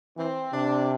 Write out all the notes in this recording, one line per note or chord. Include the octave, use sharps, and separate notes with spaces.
E3 C4
C3 D4